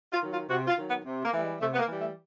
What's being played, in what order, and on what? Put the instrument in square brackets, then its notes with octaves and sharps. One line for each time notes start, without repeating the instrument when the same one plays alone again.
[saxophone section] F4
D#3 F#3
F4
C3 F#4
F4
D#3 F#3
B3
C3
A#3
E3 G3 A3
G#3
C3 A3
B3
A#3
E3 G3
A3